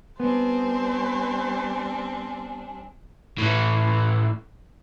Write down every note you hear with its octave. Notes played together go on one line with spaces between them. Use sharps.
G3 B3 C4 D4 C5 G#5
A2 E3